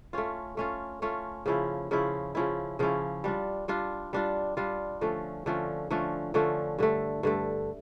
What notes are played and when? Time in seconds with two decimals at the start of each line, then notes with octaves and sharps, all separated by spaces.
0.13 A3 C#4 F4
0.57 A3 C#4 F4
1.02 A3 C#4 F4
1.46 C#3 F3 C#4 E4
1.91 C#3 F3 C#4 E4
2.35 C#3 F3 C#4 E4
2.79 C#3 F3 C#4 E4
3.24 G3 D4 F4
3.68 G3 D4 F4
4.13 G3 D4 F4
4.57 G3 D4 F4
5.01 D3 F3 A3 C#4
5.46 D3 F3 A3 C#4
5.91 D3 F3 A3 C#4
6.34 D3 F3 A3 C#4
6.79 G2 D3 A3
7.23 G2 D3 A3